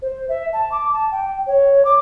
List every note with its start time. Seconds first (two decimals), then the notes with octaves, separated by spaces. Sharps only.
0.02 C5
0.29 E5
0.53 A5
0.72 D6
0.93 A5
1.11 G5
1.46 C#5
1.85 D6